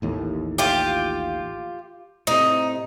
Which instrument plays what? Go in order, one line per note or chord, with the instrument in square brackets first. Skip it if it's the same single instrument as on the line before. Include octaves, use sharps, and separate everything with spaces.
[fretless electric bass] A1 D#2 A2
[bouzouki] F4 G4
[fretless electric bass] A2 C3 [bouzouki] D#4